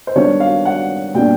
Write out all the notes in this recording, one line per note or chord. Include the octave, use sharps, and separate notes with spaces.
C5
D#3 G3 B3 D4 C#5
F5
F#5
A#2 G3 B3 D4 G5